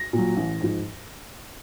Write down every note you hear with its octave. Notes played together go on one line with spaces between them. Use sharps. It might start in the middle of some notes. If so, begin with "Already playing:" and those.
Already playing: A#6
A#2 F#3
A1
G#2 F3